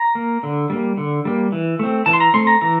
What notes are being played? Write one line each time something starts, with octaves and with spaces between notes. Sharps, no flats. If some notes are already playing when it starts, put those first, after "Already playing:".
Already playing: A#5
A#3
D3
G3 A#3
D3
G3 A#3
E3
A3 C4
E3 A5
C6
A#5
A3 C4 C6
A#5
E3 A#5